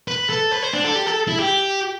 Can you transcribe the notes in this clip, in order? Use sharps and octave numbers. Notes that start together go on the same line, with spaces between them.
B4
A4
B4
C5
D4
A4
G4
A4
E4
G4